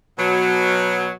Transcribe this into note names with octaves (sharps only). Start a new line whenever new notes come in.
B2 F#3